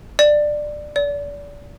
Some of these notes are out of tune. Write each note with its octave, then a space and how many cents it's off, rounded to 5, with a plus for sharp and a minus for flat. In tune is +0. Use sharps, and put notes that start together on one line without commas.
D5 +15
D5 -35